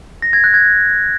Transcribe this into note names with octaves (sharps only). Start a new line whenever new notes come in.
A#6
G#6
F#6
G#6